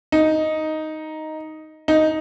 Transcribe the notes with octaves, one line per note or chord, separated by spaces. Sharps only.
D#4
D#4